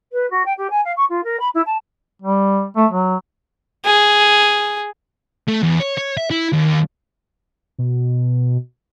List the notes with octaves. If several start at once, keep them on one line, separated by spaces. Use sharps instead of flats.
B4
F#4
G5
G4
G#5
F5
C#6
F4
A#4
B5
E4
A5
G3
A3
F#3
G#4
A3
E2
C#5
C#5
E5
E4
D#2
B2